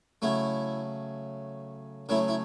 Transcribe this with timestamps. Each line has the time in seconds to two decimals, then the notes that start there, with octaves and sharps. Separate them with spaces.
0.22 C#3 F#3 A3 E4
2.09 C#3 F#3 A3 E4
2.28 E4